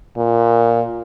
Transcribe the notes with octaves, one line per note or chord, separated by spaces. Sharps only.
A#2